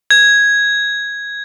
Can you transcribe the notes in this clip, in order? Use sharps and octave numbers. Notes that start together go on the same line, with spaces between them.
G#6